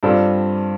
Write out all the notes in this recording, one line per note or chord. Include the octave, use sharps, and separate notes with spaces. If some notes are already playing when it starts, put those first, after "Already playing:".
G2 G3 C4 F4 A4